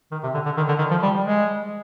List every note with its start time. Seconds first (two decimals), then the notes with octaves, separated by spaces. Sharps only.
0.12 D#3
0.23 C3
0.34 D3
0.46 D3
0.57 D#3
0.68 D3
0.79 D#3
0.91 F3
1.02 G3
1.24 G#3